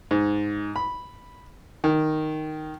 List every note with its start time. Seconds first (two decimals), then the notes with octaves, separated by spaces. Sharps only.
0.11 G#2
0.76 B5
1.84 D#3